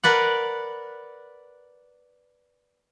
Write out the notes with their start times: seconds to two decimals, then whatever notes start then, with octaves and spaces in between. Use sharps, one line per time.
0.04 A#4 B4 D5 F#5